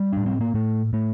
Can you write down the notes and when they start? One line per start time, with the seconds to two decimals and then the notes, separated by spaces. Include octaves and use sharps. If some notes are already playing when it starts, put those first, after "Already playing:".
Already playing: G3
0.13 A2 D4
0.26 C4
0.41 A#3
0.54 A2 A3
0.93 A2 A3